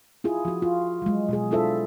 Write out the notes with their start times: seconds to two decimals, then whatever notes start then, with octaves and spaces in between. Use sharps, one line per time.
0.24 E4 F4 G#4
0.45 F3 F#4
0.62 F4
1.02 F#3 G#3
1.29 B2 G#3 G#4
1.51 D4 E4 F4 A4 C5 E5